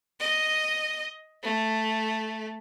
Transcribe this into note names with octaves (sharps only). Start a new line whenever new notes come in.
D#5
A3